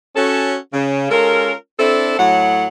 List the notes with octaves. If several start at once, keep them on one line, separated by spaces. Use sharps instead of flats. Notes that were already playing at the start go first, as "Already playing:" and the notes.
C#4 F#4 A4
C#3
G#3 C#4 F4 A4 A#4
C4 D4 E4 A4
A2 F#3 F#5